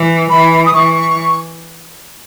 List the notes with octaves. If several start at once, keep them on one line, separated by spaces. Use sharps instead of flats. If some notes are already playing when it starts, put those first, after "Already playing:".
Already playing: E3
E3 B5
D#6
E3 C#6